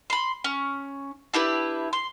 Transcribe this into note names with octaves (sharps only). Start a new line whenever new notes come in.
B5 C6
C#4
D4 E4 G4 B4
C6